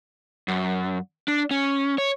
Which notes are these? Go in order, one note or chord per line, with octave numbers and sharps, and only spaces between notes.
F#2
D4
C#4
C#5